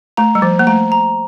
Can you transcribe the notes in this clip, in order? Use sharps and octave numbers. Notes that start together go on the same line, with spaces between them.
A3 A#5
G3
F3 C5
A#3
A3 A#5
A#5